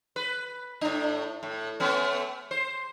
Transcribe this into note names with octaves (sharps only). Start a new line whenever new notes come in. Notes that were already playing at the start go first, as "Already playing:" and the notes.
B4
A2 D4
A2
A3 B3 C#4
C5